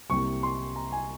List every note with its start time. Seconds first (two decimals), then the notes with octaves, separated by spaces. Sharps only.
0.09 C2 C3 G3 A#3 C#6
0.43 C6
0.76 A#5
0.92 G#5